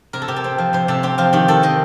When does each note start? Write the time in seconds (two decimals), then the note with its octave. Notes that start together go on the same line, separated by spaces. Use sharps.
0.13 C3 A#4
0.22 A4
0.28 C3 G4
0.36 A4
0.44 C4
0.58 F3
0.73 C3 C5
0.88 C3 A4
1.03 C4 G4
1.18 F3 F4
1.33 D#3 G4
1.48 D#3 A4
1.63 C4 D#5